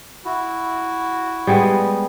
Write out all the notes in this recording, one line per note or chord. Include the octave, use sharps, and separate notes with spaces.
E4 F#4
G3 G#3 B3